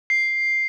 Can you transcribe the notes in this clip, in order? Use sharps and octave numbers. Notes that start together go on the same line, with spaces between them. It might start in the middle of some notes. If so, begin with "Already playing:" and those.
C7